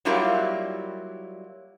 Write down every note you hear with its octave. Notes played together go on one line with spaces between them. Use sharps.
F#3 G3 A#3 E4 F4 G4